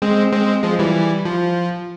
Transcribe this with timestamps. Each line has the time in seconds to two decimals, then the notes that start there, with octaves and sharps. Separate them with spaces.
0.02 G#3 C4
0.33 G#3 C4
0.63 F3 G#3
0.79 E3 G3
1.25 F3